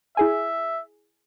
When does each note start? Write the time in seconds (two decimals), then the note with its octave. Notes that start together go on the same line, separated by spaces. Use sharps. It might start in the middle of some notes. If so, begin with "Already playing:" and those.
0.17 E4 G#4 E5 G#5